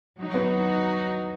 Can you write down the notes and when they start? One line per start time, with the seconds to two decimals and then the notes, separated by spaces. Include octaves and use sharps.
0.19 F#3 D#4 F#4
0.34 B3